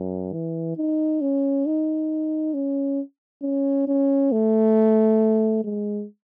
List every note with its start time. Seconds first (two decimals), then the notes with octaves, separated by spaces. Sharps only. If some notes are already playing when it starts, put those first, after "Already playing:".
Already playing: F#2
0.33 E3
0.77 D#4
1.21 C#4
1.66 D#4
2.54 C#4
3.42 C#4
3.88 C#4
4.32 A3
5.64 G#3